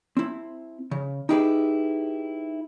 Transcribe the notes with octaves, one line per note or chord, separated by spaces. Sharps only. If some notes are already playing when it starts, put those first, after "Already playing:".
C4 E4
C#3
D#4 E4 G4 G#4 A#4 B4